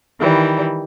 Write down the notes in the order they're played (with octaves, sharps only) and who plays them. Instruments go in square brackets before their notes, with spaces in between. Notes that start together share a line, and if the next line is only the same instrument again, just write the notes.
[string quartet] D#3 E3 G3